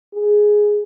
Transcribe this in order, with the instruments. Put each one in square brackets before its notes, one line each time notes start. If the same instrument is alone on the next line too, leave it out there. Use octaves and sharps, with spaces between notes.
[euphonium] G#4